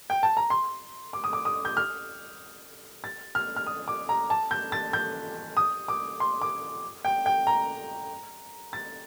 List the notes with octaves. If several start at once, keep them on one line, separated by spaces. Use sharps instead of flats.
G5
A5
A#5
C6
D6
D#6
D6
D#6
G6
F6
A6
F6
F6
D#6
D6
A#5
A5
G6
A6
G6
D#6
D6
C6
D6
G5
G5
A#5
A6